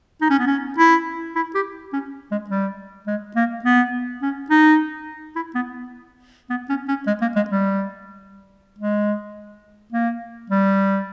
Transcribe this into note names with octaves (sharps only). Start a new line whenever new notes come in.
D#4
C#4
B3
C#4
E4
E4
G4
C#4
G#3
G3
G#3
A#3
B3
C#4
D#4
E4
B3
B3
C#4
C#4
G#3
A#3
G#3
G3
G#3
A#3
G3